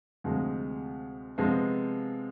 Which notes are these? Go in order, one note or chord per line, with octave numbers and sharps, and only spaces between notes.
D2 C3 F3 G#3
C3 F3 G#3 B3